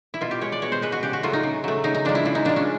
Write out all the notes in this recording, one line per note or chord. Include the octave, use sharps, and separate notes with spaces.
E4
B2 F4
G4
G#3 C#5
D5
B2 C#5
C5
G#3 B4
F#4
C#3 G4
F#4
F#3 A3 F4
D#4
C#3
F#3 A3
C#3 D#4
D#4
F3 G#3 D4
E4
C#3 E4
D#4
F3 G#3 D4
C#4